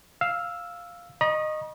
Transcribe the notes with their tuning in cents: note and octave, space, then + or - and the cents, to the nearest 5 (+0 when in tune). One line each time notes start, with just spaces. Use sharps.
F5 +0 E6 +0
D#5 -15 A#5 +45 C#6 -20